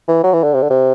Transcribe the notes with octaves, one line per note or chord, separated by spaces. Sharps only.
E3
F#3
E3
D3
C3
D3
C3